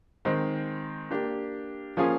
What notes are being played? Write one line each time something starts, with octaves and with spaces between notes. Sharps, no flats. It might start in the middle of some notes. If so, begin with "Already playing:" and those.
D#3 G#3 C4
A#3 D4 G4
F3 A#3 C#4 F4 G#4